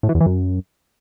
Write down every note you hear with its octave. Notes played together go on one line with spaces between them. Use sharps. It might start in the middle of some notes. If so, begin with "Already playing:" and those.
A2
E3
E2
E3
F#2